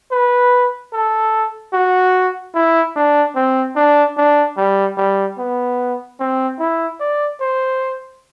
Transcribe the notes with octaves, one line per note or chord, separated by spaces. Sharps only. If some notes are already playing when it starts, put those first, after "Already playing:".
B4
A4
F#4
E4
D4
C4
D4
D4
G3
G3
B3
C4
E4
D5
C5